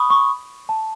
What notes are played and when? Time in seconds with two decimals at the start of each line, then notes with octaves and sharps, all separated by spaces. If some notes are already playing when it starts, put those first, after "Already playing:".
Already playing: B5 C#6 D#6
0.10 C#6
0.69 A5